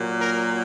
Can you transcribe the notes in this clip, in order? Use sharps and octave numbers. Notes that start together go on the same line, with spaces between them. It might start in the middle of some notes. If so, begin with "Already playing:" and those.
Already playing: A#2 F#3
A#4